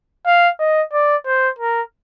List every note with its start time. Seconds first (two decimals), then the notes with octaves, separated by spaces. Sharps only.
0.26 F5
0.59 D#5
0.93 D5
1.26 C5
1.58 A#4